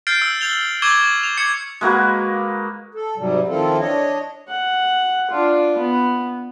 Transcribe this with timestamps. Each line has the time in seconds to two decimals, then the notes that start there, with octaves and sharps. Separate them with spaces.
0.07 F6 G6 A6 C7 D7
0.22 E6
0.41 G6 F7 G7
0.82 C#6 D6 E6 G6 G#6 G7
1.23 F7
1.38 D6 G#6 C#7
1.81 G#3 A#3 F#4 B4
2.95 A4
3.18 G#2 C3 F#3 G3
3.48 D#3 F3 C4 E4 F4 A4
3.79 D4 C#5 D#5
4.48 F#5
5.31 D4 F4
5.78 B3